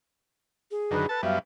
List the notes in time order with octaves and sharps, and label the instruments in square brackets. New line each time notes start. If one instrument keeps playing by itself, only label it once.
[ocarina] G#4
[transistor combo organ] F#2 D3 D#3 [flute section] B4
[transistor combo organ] A4 A5 [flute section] B4
[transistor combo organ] F#2 G3 B3 [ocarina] E5 [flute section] F5